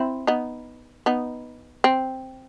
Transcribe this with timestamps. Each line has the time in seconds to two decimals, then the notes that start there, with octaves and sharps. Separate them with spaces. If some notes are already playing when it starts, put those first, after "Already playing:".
Already playing: C4 E4
0.27 B3 D#4
1.06 B3 D#4
1.84 C4